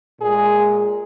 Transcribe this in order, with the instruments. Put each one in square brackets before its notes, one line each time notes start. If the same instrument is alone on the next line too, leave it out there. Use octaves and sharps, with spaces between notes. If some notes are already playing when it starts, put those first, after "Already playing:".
[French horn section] A#2 G#3 G#4